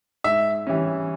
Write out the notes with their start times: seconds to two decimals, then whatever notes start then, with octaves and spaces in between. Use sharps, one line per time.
0.24 G#2 E5
0.67 E3 G3 C#4